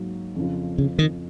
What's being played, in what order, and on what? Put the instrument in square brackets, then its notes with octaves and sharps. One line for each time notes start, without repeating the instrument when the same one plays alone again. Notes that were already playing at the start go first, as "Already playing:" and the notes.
Already playing: [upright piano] G#2 F#3 A#3
F2 C#3 F3
[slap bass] C#3
D#3